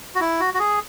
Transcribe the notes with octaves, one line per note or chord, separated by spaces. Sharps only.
F#4
E4
F#4
F#4
G#4